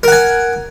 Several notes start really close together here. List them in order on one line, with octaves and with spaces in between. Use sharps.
A#4 F#5 G#5